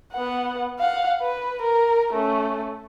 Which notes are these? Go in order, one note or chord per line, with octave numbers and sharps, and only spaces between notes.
B3 F#5
F5 F#5
B4
A#4
A3 C#4